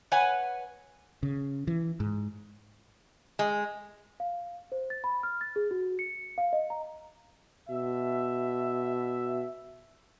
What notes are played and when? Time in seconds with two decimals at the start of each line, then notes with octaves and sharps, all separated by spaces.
0.12 B4 C#5 F#5 G#5
1.23 C#3
1.67 E3
2.00 G#2
3.39 G#3
4.20 F5
4.72 C5
4.90 A6
5.04 B5
5.23 F6
5.41 A6
5.56 G#4
5.71 F#4
5.99 C#7
6.38 F5
6.53 D#5
6.70 A#5
7.69 B2 E5